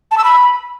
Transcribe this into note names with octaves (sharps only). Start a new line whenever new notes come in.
A5
E6
B5